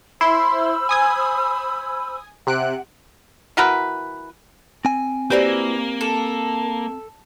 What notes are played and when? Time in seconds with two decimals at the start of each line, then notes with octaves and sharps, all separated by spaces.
0.21 E4 C5 B5 C6 E6
0.89 G#5 D#6 G#6
2.47 C3 F#5 F#6 D7
3.57 E3 F#4 A#4 B4
4.85 C4 G#5
5.30 A#3 E4 F#4 G4 B4 C5 D5
6.01 A4